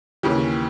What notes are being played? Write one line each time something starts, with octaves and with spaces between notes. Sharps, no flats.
D#2 C#3 E3 G4